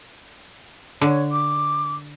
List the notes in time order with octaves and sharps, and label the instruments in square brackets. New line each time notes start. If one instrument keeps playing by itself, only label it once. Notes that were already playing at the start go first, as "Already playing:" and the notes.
[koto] D3 [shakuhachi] C#5
[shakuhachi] D6